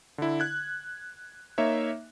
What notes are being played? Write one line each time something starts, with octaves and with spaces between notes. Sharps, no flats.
D3 E4
F#6 G#6
A#3 D#4 C#5 E5